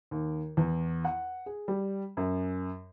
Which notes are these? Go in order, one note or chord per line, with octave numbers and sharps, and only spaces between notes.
D#2
E2
F#5
G#4
G3
F#2